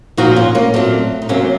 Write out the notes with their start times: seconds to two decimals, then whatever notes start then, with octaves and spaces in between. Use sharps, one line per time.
0.17 A#2 F3 D#4 F#4
0.36 C#4 F4
0.55 A#3 C#4
0.74 A#2 F#3 A3 C4
1.22 D#4
1.29 C3 F#3 A#3 C#4